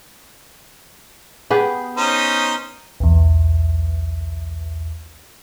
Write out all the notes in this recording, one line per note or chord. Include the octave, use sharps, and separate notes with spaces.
B3 G4 G#4
C#4 D#4 C5
B1 E2